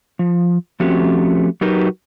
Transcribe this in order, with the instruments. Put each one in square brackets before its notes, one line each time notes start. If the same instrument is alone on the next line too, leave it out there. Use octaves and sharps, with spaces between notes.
[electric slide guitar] F3
F3 A3 C4 C#4 F#4 G4
F#3 D#4 F#4 G4 A#4 B4